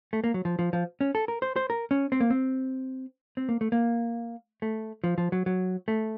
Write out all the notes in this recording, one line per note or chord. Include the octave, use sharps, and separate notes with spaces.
A3
A#3
F#3
F3
F3
F3
C#4
A4
A#4
C5
C5
A#4
C#4
C4
A#3
C4
C4
A#3
A3
A#3
A3
F3
F3
F#3
F#3
A3